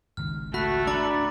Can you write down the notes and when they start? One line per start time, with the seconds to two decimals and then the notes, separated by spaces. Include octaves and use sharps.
0.17 G#1 C#2 D#3 F6
0.54 A3 F#4 B5 F#6 B6
0.87 D4 A#5 B5 D6 A6